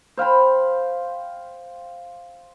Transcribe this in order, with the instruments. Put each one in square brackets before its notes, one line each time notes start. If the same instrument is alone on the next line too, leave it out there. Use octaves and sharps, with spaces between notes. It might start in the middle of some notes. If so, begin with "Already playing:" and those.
[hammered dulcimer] C5 F5 G5 B5